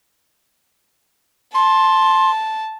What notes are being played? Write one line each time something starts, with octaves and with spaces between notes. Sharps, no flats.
A5 C6